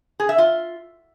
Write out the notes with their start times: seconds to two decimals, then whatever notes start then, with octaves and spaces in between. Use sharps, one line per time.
0.20 G#4
0.29 E5
0.38 F4